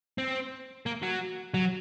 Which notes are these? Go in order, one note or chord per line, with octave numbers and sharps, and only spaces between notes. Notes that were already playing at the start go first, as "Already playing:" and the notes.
C4
A#3
F#3
F#3